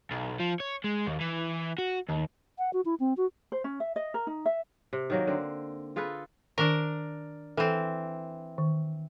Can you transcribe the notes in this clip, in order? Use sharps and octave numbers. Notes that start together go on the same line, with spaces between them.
B1
F3
C#5
G#3
D#2
E3
F#4
D#2
F#5
F#4
E4
C4
F#4
C5
C#4
E5
D#5
A#4
D#4
E5
C3
D#3 F#3 A#3
D3 C4
F4 G#4 A4 B4
D#3 D4 A#4
E3 C4 A4
D#3